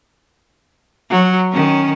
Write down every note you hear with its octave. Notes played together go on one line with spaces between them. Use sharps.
F#3
D#3 C#4